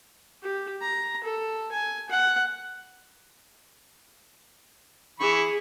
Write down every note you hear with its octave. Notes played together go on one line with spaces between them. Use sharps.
G4
A#5
A4
G#5
F#5
E3 G#4 B5 C#6